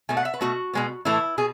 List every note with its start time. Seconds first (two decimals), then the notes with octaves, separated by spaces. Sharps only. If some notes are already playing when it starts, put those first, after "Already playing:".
0.09 B2 A3 G#5
0.17 F#5
0.25 E5
0.34 B4
0.41 B2 A3 F#4
0.73 B2 G#3 B3
1.05 A2 E3 A3 E4
1.38 B2 G#4